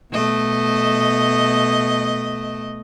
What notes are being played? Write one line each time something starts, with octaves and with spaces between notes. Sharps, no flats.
B2 A3 D#5